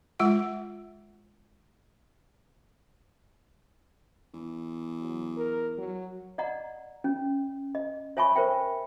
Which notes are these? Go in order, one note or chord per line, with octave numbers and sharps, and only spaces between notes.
G#3 F4 F#5
E2
F#3
A#4
F#3
D5 D#5 F#5 A#5
C#4
D#5
C#5 E5 G#5 A5 B5 C#6
A#4 C5 E5 G5